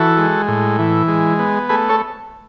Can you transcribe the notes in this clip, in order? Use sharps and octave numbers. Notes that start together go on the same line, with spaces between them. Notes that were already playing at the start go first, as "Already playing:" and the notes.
Already playing: E3 F#4 A4
G#3
A2
E3
G#3
B3
A3 G#4 B4
A4 C#5